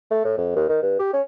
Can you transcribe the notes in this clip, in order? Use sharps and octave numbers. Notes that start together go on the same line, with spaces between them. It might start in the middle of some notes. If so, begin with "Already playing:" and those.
A3
A2
F2
D#2
D#3
G2
G4
C#4